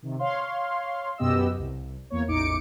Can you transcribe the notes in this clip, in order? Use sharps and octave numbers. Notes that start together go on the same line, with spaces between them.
C3 D#3
C#5 F5 C6
F#2 B2 B3 G4 D#5 E6
C2
E2 A#3 C#5
A1 E2 D#4 D6 C#7 D7